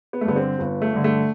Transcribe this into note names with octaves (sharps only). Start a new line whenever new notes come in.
B3
A3
G2 D3 B3
C4
G1 B3
A3
G2 D3
A3